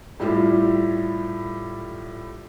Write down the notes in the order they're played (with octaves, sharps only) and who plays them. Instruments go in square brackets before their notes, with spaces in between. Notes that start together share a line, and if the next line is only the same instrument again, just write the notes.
[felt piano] A2 G3 E4 F4 G4